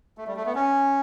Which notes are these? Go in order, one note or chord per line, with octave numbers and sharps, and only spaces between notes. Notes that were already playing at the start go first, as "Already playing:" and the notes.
A3
G3
A3
B3
C#4